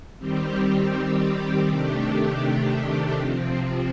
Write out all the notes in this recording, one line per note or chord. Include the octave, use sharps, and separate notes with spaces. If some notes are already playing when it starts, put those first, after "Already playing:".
D#3 G3 C4 G4
C3 D#3 A3 D4 G4
C3 F3 C4